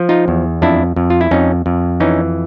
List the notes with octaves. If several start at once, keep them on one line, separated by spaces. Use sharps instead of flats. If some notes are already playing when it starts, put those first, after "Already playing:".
Already playing: F3
D#4 F4
E2
F2 D4 E4
F2
F4
E4
F2 C#4 D#4
F2
E3 C#4 D#4